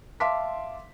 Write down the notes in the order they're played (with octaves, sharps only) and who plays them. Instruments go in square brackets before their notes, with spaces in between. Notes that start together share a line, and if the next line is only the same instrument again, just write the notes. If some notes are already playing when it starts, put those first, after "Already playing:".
[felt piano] E5 F5 A5 C6 D6 B6